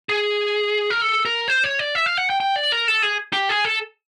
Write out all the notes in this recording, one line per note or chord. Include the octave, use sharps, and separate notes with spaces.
G#4
A#4
A4
A#4
C5
C#5
D5
E5
F5
F#5
G5
G5
D5
A#4
A4
G#4
G4
G#4
A4